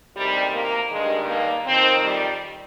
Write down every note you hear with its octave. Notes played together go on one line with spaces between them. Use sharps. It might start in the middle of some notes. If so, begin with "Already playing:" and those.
D2 C3 D#3 G3
A#3
G2 D#3 G#3
A#3
F2 D#3 C4
G3